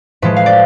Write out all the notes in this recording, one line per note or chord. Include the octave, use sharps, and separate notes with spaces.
A2 F3 G#3 B4
F5
D5